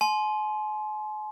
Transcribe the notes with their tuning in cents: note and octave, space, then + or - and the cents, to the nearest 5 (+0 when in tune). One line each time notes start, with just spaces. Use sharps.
G#5 +45 C6 +0